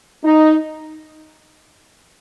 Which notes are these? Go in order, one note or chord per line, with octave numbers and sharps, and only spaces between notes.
D#4